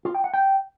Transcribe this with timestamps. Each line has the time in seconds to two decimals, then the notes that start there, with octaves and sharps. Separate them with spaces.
0.05 F4
0.15 G5
0.24 F#5
0.34 G5